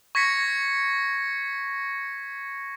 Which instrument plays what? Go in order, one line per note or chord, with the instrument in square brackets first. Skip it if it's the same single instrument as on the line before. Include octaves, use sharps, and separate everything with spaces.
[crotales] C#6 G#6 A#6 B6 C#7